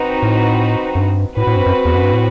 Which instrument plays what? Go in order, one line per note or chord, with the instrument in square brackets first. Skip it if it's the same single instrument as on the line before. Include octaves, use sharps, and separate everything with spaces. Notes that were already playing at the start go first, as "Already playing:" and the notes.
Already playing: [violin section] C4 D#4 F#4 B4
[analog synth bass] A2
F#2
G2
[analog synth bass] A2 [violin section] C4 F#4 B4
[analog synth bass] A2
G2
F#2
E2
F#2
G2
A2